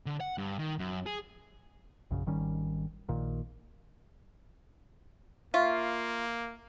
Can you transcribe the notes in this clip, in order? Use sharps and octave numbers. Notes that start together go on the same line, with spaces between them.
D3
F#5
G2
D#3
F#2
G#4
A#1 F#2 C#3
G#1 D#3 G3 C#4
A#1 A#2 D#3
A#3 F4 E5 F5 C#6